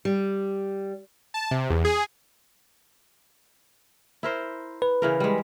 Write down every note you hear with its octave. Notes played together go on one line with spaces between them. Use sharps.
G3
A5
C3
E2
G#4
E4 A#4 C5
B4
C#3 E3 A#4
G3 G#3